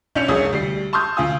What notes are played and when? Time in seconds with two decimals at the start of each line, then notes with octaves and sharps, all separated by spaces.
0.15 B1 C#4 D4 G6 C#7 F7
0.28 C2 F2 A3 G#4 C#5 D#6
0.52 D2 G3 C7
0.93 A5 C6 C#6 D#6 F6 G6
1.17 D2 F4 G#5 D#6